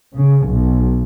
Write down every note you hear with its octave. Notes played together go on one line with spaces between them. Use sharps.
C#3
B1